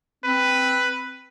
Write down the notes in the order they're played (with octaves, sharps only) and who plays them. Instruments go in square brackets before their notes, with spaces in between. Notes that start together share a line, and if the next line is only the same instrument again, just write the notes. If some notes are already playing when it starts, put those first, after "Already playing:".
[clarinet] C4 [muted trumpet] B4